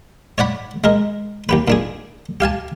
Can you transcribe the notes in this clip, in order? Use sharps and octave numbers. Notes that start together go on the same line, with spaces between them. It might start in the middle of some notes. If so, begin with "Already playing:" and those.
C#5 D5 F#5 B5
G#3 A#4 D#5
D#2 G4 B4
A#2 D4 G#4
G4 F5 G#5 A5